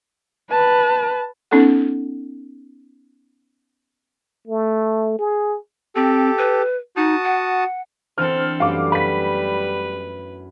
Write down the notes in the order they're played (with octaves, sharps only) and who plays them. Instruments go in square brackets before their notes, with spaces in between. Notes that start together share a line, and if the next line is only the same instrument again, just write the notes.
[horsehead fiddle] B4 [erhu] A5
[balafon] B3 C#4 D#4 A4 F#5
[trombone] A3
G#4
[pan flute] C4 [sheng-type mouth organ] G4 A4
[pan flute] B4
[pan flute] D#4 [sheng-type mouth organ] F#4 A5 D#6
[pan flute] F#5
[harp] E3 B3 D4 [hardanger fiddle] C4 A4 [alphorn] C5 [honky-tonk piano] F6
[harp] F#2 A3 B4 [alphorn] G3 [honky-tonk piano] F5 D6
[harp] F#4 [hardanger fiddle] B4 [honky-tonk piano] B5 B6